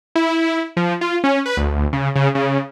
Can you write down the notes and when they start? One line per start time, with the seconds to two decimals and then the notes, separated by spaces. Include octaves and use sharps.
0.15 E4
0.77 F3
1.01 F4
1.24 C#4
1.46 B4
1.57 D2
1.93 C#3
2.16 C#3
2.35 C#3